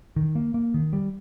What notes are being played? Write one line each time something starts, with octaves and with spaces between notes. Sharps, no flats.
D#3
A#3
A#3
D#3
G3